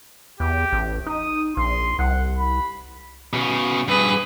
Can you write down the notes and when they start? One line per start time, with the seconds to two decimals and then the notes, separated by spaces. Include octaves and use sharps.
0.40 E2 G4
0.73 A1
1.06 D#4 D#6
1.57 A#1 C6
1.99 C2 F#5
2.38 B5
3.33 B2 C#4
3.88 G2 G#4 B4